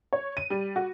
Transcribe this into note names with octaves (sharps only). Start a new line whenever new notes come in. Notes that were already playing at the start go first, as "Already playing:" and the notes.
C#5
D#7
G3
F#4